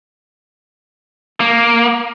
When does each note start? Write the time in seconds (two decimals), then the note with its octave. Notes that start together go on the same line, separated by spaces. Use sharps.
1.40 A#3